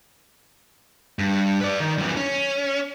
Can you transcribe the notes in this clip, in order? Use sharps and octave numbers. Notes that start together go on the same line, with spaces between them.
G2
B4 D5
D#3
F#2 E3
C#4